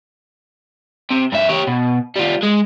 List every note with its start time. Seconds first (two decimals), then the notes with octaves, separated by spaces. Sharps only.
1.11 C3
1.32 G2 E5
1.49 G4 C#5
1.67 B2
2.16 G3 F4
2.43 G#3